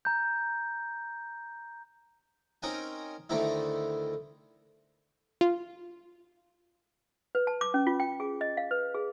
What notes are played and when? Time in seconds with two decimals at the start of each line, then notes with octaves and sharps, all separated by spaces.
0.05 A#5 G6
2.63 C4 C#4 D#4 A#4 G5 G#5
3.30 D2 D#3 A3 C4 D#4 E4
5.41 F4
7.35 B4
7.47 A5
7.61 D6
7.74 C#4
7.87 F4
8.00 G5
8.20 G#4
8.41 D#5
8.57 F5
8.71 B4
8.95 G#4